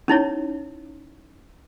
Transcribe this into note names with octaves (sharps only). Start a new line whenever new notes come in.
C#4 D#4 E4 C#5